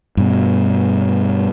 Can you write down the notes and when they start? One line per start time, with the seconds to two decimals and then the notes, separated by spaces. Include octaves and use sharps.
0.17 G2 B2